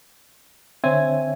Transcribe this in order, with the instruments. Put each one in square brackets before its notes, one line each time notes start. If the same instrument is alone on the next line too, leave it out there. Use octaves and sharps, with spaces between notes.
[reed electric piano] D3 C#5 E5 [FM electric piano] C4 G#5